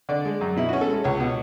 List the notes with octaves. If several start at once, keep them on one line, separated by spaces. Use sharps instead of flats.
D3 D5
G#3
F#2
B2 E4
C#4 F#4
A4
G#3
C#2 C#5
B2